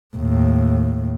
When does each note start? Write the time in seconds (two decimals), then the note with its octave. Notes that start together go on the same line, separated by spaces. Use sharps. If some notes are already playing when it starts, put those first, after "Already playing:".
0.16 D#2 A2